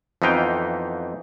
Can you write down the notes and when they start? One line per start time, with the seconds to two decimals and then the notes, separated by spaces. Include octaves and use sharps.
0.22 F2 E3 B3 D#4 F5 G5